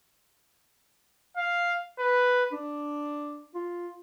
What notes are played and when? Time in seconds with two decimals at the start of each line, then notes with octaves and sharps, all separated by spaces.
1.37 F5
1.99 B4
2.53 D4
3.55 F4